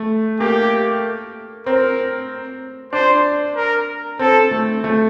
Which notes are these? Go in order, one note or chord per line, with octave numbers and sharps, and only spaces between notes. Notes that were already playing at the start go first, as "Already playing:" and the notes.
Already playing: A3
A#3 G4
C4 A#4
D4 C5
A#4
C4 A4
A3
A3